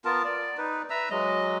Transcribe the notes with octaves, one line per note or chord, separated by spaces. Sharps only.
B3 F4 A#4 A5
D5
D#4 B4
B4 E5 A#5 E6
F#3 G#3 D#5